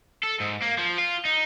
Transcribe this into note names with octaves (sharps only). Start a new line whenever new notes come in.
A4
G#2
A#3
F3
F4
D#4